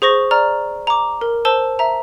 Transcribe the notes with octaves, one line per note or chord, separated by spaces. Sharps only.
G#4 C5 C#6 A#6
D5 A#5 F6
A#5 D6
A#4
C5 A5 E6 G7
E5 A#5